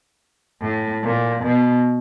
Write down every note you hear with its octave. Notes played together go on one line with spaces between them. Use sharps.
A2
A#2
B2